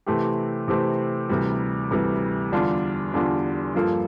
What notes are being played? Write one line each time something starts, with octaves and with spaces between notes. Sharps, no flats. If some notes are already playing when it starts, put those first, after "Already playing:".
C3 E3 A3 C4 G4
C3 E3 A3 C4 G4
D2 C3 E3 G3
D2 C3 E3 G3
E2 D3 G3 D4 F4
E2 D3 G3 D4 F4
G2 F3 A#3 F4 A4